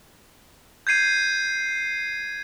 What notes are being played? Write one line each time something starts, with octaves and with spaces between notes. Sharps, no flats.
G6 G#6 C7 D#7